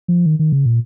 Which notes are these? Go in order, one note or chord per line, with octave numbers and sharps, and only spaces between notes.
F3
D#3
D#3
C#3
A#2